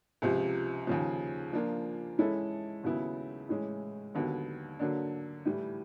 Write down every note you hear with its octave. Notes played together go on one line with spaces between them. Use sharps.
C#2 C3 F3
D#2 C#3 F3
F3 A#3 D4 F4
E3 G#3 C#4 E4 A4
D#2 C#3 F#3 B3 E4
A2 E3 G#3 C#4
D#2 D3 F#3 B3
D3 F#3 A#3 D4
A2 E3 G3